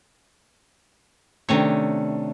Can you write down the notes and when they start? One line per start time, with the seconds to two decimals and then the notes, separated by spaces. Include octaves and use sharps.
1.49 C3 D#3 A3 C#4 D4 C#5